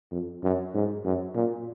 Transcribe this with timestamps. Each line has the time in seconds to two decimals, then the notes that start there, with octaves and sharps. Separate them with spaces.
0.11 F2
0.43 F#2
0.74 G#2
1.04 F#2
1.35 A#2